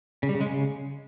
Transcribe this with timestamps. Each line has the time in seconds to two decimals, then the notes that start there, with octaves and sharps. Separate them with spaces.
0.23 C#3
0.29 G3
0.35 C#3
0.41 G#3
0.47 C#3